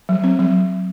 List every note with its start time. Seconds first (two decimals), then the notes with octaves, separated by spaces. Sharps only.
0.09 F#3
0.24 C4
0.39 F#3